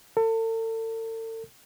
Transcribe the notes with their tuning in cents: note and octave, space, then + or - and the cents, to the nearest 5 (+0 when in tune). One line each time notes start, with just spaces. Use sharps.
A4 +40